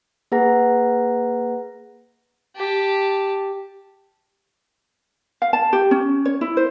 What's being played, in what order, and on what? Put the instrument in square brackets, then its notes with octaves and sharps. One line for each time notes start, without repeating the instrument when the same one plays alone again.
[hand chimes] A#3 G#4 B4 F#5 A#5 A#6
[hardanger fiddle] G4 A5
[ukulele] F5
A5
G4
C#4
C#5
E4
C5